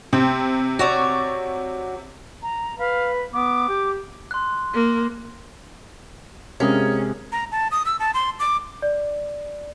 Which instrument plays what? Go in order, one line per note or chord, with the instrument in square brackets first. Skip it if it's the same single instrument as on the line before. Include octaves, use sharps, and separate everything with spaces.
[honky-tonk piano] C3 [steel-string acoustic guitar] C4
[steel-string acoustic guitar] F#4 C#5 D5
[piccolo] A#5
[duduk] B4 [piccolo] F5
[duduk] B3 [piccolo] D6
[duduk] G4
[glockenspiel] C6 F#6
[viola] A#3
[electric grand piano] C3 G#3 [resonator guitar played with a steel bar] C#4 [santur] G#4 A#4 F5
[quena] A#5
A5
D#6
E6
A5
C6
D6
[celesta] D5